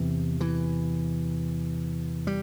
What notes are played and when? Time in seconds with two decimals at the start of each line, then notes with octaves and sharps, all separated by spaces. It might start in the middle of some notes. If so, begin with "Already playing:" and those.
Already playing: E2 C3 E3
0.41 E3
2.27 G3